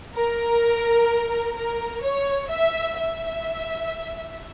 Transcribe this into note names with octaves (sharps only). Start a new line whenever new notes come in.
A#4
A#4
C#5
E5
E5